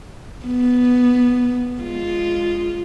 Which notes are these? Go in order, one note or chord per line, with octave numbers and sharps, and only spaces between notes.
B3
G#3 F4